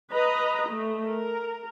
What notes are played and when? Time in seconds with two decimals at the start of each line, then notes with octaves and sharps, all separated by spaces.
0.12 B4 D#5 A#5
0.68 A3
1.06 A#4